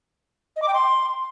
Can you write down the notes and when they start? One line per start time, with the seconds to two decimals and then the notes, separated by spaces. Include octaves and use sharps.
0.56 D#5
0.62 D6
0.68 G5
0.74 C6